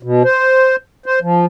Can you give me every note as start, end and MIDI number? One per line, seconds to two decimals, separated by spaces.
0.03 0.23 47
0.25 0.76 72
1.06 1.19 72
1.22 1.46 53